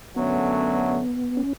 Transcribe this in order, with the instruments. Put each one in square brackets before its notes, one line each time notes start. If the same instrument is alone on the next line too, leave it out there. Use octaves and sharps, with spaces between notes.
[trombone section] F#2 D3 F#3 A3 C#4 [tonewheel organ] B3
[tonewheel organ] C#4